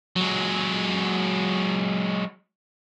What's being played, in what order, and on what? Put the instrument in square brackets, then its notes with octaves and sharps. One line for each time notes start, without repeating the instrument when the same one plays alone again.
[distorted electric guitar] F#3 G#3